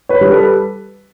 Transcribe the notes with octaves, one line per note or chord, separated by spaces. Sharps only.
B4 C#5
G3
A4 B4